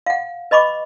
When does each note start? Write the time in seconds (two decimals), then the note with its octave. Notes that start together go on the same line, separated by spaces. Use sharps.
0.06 F5 F#5
0.51 B4 D#5 B5 C#6 D6